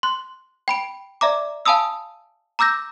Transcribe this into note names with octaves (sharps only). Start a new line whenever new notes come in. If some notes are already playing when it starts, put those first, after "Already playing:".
C6 F#6
G5 B5 D7
D5 E5 A#5 D6
F5 G#5 A5 B5 D#6 E6
A#5 D6 E6 G6 A#6